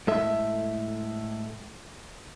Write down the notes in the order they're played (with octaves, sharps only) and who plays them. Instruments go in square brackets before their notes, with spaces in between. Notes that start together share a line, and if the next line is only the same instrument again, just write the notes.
[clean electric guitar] A2 G#3 A4 E5